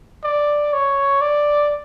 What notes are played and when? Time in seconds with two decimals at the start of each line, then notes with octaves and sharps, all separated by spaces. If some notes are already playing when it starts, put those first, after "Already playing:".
0.24 D5
0.73 C#5
1.21 D5